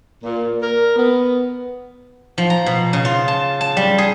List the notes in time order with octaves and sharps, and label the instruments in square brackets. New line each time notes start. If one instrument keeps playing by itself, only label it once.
[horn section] A#2
A#4
B3
[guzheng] F3
A#5
B2
C#3
F4
A5
A5
G3
G#4